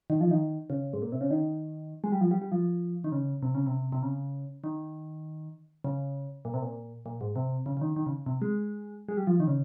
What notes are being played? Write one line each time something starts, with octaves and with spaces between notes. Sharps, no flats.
D#3
F3
D#3
C#3
G#2
A#2
C3
C#3
D#3
G#3
G3
F3
G3
G3
F3
D#3
C#3
C3
C#3
C3
C3
C#3
D#3
C#3
A#2
C3
A#2
A#2
G#2
C3
C#3
C#3
D#3
D#3
C#3
C3
G#3
G#3
G3
F3
D#3
C#3